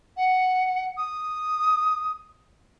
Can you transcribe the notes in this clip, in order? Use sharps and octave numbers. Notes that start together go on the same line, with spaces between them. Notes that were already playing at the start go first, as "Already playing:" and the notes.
F#5
D#6